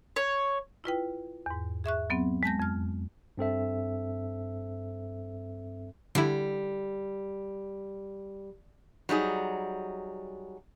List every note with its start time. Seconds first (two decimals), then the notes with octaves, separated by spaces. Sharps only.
0.16 C#5
0.84 E4 F4 B4 G5
1.46 E2 G#2
1.84 G#4 E5 C#6 F#6
2.10 F#3 B3 C4
2.43 G#3 A5 G6 A#6
2.60 F2 F6
3.38 G2 C4 A4 E5
6.15 D3 G3 E4
9.09 F#3 G3 D#4 G#4